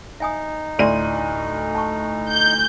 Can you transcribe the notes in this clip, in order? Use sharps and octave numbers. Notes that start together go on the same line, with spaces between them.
D#4 E5 G#5 D#6
D2 A2 D5 E5 C6 D#7
A5 C#6
G6